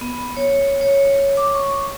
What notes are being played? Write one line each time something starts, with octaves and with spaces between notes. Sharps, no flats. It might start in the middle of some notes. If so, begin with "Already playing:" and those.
B3
C#5
C#5
D6
C#6